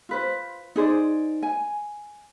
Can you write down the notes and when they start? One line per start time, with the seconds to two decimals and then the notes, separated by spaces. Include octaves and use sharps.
0.09 F4 B4 C5
0.76 D#4 G#4 C5 D5
1.43 G#5